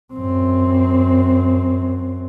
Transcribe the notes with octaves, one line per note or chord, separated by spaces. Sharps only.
F#2 C4